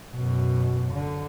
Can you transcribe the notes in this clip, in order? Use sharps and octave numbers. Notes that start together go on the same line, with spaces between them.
F#2 B2
D3